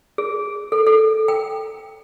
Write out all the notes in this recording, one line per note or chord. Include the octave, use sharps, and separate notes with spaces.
G#4
A4
A4
G5